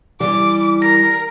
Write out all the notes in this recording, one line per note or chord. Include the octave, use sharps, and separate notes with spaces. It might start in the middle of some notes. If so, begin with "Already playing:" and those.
E3 G3 D6
A#4 A#6